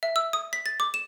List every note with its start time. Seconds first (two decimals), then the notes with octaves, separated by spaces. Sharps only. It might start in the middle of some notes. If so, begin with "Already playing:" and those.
0.03 E5
0.16 E6
0.33 D#6
0.53 B6
0.66 A6
0.80 D6
0.94 E7